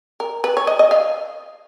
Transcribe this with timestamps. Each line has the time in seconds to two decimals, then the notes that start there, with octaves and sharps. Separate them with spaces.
0.20 A#4
0.44 B4
0.57 C#5
0.67 D#5
0.79 D#5
0.91 F5